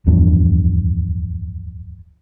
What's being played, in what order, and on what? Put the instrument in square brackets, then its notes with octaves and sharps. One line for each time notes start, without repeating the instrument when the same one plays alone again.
[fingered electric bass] D1 E2 G2 F3